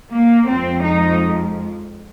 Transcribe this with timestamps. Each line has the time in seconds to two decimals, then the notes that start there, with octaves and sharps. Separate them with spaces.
0.11 A#3
0.48 F2 F3 G#3 C4
0.84 D#4